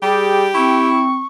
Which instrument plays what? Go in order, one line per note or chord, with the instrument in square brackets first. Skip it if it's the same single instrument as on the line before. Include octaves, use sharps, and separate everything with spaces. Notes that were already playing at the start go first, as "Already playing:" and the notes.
[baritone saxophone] G3 [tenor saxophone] G4 [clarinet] G#4
[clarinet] C4 [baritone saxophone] E4 [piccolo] C#6